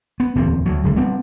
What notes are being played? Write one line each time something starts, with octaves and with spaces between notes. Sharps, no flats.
B3
D1 E2 A#2 C4
D2 F#3
D1 C#2
G3 B3 C4 D4